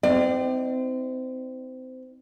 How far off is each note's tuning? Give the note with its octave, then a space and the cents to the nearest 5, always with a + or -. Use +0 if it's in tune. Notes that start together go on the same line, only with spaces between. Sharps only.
C4 -25 D#4 +45 D5 +35